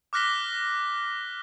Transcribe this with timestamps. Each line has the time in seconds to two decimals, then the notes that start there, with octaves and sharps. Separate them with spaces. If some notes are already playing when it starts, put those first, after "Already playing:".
0.13 D6 F6 F#6 A#6 B6 G7